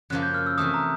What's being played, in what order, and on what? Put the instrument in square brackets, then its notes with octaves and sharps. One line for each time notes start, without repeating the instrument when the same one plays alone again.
[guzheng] F#2 C#3 F3 A#3 [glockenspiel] F#6
[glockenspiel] G6
F6
E6
[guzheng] C3 E3 A3 [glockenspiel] D#6
[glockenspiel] A#5